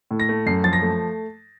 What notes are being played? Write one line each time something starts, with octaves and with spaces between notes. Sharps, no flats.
A2
A#6
A3
F#2 C7
F3 A6
A#6
A3